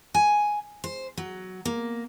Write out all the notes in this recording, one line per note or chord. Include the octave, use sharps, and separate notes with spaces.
G#5
C5
F#3
A#3